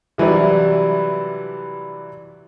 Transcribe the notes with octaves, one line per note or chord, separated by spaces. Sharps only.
C3 E3 F#3 G3 D4